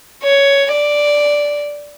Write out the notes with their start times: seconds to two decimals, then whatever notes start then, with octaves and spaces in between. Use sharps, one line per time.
0.23 C#5
0.72 D5